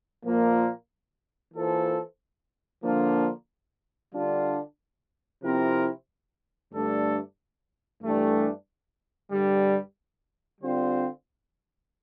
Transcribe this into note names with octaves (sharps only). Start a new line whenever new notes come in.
A#2 F3 A#3 F4 A#4
E3 A#3 F4 A4 C5
D3 F3 A#3 D4 F4
D3 G3 D4 F4
C3 F3 C4 E4 A#4
G2 D3 A3 D4 A4
G2 E3 A3 D4 G4
G2 D3 G3
D3 G3 C4 F4 C5